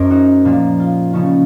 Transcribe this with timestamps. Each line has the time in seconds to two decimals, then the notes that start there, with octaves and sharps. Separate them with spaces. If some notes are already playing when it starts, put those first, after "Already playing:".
Already playing: F#2 F#3 A3 C#4 A#4 C5 D#5
0.10 D#4 F#4
0.45 A#2 F3 A#3
0.80 F4
1.13 C#3 F3 A3 C#4 D#4